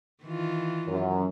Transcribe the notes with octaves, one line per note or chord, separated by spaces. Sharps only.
D#3 E3 F4
F#2